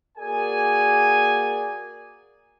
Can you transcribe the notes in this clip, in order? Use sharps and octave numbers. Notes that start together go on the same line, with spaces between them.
A#3 F#4 G#4 A#4 D5 G#5